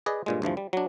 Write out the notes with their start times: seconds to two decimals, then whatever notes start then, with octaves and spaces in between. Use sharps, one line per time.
0.06 G#4 B4 D5 D#5
0.26 G2 A#2 G#3
0.42 D2 G2 E3 F3
0.57 G3
0.73 F#3 D4